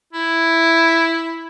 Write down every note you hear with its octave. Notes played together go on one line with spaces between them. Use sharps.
E4